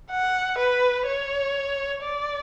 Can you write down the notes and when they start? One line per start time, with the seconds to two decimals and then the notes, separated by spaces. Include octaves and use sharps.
0.11 F#5
0.58 B4
1.06 C#5
2.03 D5